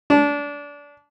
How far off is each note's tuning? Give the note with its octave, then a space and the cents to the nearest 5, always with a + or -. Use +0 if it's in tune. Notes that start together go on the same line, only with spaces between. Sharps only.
D4 -25